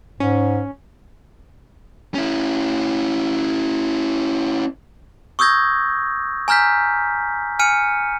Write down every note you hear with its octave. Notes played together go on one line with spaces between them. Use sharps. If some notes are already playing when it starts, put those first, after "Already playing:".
G#2 C#4
C#4 E4
C#6 D#6 E6 G6 G#6 A#6
G#5 A#5 F6 G6 B6
G#5 F6 C#7 D#7